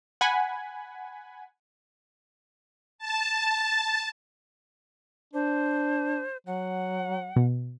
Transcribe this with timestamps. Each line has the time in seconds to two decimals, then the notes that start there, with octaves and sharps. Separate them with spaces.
0.21 F#5 G#5 B5
2.98 A5
5.34 D4 C5
6.47 F#3 F#5
7.36 B2